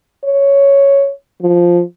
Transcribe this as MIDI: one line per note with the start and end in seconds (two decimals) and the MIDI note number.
0.25 1.10 73
1.41 1.82 53